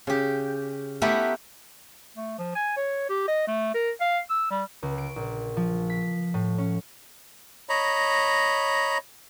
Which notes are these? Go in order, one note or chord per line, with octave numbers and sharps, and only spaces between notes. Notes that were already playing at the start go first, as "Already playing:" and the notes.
C#3 G4
A3 B3 E4 G4 A#4 B4
A3
F3
G#5
C#5
G4
D#5
A3
A#4
F5
E6
G3
C#2
D7
A#1
F3
B6
A2
C#4
C#5 D#5 A#5 B5